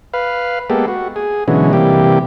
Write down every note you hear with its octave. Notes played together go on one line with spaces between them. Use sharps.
B4 F5
G#3 A#3 B3 G4 A4
F#4
G#4
B2 D3 E3 F#3 G#3 C#4
C3 E3 G3 A#3 G4